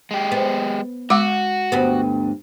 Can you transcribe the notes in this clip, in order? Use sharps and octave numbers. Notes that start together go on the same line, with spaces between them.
G#3 G4
B3
G#3 F#4 F#5 D6
D2 G2 B3